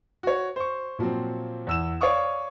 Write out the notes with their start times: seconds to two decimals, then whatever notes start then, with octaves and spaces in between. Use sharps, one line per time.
0.23 F#4 C#5
0.56 C5 C#6
0.99 A#2 F3 F#3 C4
1.67 E2 E6 E7
2.01 C#5 D5 F5 C#6 D#6